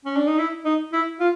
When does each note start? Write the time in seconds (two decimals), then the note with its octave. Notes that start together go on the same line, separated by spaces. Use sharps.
0.05 C#4
0.16 D4
0.27 D#4
0.38 E4
0.65 D#4
0.93 E4
1.20 F4